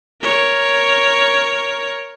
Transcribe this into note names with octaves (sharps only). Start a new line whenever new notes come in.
A#4 C#5